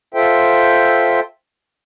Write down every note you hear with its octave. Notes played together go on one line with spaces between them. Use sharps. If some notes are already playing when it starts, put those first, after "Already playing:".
F4 A4 C5 E5 G5